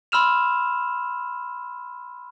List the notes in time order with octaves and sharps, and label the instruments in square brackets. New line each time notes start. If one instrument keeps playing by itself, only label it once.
[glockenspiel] B5 C6 E6 F6 E7 F7